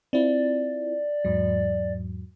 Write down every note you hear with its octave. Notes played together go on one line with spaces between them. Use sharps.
C4 E4 F4 D5
E2 G#2 F#3